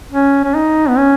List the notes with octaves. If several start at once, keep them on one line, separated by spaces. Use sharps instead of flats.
C#4
C#4
D#4
B3
C#4